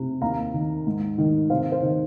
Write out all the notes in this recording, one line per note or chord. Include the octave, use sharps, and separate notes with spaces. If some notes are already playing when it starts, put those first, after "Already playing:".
Already playing: C3
D#2 F5 A#5
D#3
G#2
D#3
C3 C5 F5
C5 F5
D#3